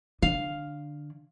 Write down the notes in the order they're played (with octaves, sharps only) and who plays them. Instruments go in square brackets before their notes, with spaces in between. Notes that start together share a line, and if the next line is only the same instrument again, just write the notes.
[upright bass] D3 [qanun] F5